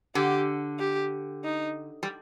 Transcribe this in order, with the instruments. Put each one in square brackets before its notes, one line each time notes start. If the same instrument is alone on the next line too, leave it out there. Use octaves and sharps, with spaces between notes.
[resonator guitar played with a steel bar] D3 [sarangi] G4
[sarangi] G4
D#4
[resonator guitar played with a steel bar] G3